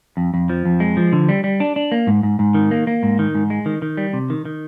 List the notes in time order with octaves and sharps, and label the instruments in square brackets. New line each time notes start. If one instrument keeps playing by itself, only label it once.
[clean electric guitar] F2
F2
F3
F2
G#3
F3
D3
G3
G3
D4
D4
A#3
G#2
G#2
G#2
D#3
A#3
A#3
G#2
D#3
G#2
G#3
D#3
D#3
G3
C3
D#3
D#3